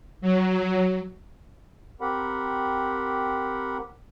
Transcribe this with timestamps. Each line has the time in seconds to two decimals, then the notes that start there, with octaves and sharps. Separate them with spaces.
0.21 F#3
2.01 C4 G4 A#4 F#5 B5